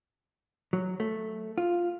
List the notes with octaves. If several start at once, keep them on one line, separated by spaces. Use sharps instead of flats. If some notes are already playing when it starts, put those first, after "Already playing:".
F#3
A3
F4